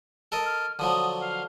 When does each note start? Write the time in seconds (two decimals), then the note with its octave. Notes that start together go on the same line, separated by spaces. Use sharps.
0.32 A4 A#4 D#5
0.46 F6
0.79 D3 F3 F#3 D#6
1.20 F5